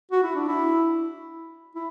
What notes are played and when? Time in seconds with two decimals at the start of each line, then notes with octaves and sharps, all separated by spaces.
0.11 F#4
0.23 E4
0.35 D4
0.48 E4
1.75 E4